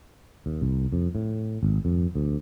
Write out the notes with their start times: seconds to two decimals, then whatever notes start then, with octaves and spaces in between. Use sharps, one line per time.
0.46 D#2
0.62 C2
0.93 F2
1.15 A2
1.63 G#1
1.85 F2
2.15 D2